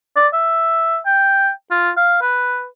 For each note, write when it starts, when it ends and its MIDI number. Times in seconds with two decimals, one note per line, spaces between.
0.16 0.27 74
0.34 0.98 76
1.06 1.50 79
1.71 1.90 65
1.97 2.18 77
2.22 2.66 71